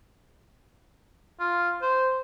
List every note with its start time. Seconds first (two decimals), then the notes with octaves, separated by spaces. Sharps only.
1.40 F4
1.82 C5